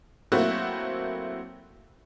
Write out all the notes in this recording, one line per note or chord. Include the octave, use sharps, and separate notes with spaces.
F#3 A3 A#3 C4 E4 F#4